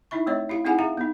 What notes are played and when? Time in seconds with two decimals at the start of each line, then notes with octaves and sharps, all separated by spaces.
0.11 D#4 E4 E5 C#6
0.27 A3 C4 C#5 D#5 E5
0.49 E4 G4 F5
0.65 C4 D#4 E4 G#4 F#5 G#5
0.79 G#4 E5 F5 A#5
0.97 B3 D#4